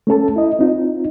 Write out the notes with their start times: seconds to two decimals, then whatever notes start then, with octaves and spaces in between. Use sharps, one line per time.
0.07 A3 C#4 A4 A5
0.36 E4 D#5
0.59 C4 D#4 F4